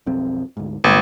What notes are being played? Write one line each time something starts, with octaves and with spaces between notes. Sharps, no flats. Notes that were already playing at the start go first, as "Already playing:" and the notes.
B1 F2 C4
D2 G#2
G1 C2 G#3 A#3